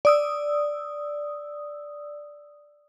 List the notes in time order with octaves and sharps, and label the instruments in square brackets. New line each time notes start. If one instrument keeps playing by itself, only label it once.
[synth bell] D5 D#6 E6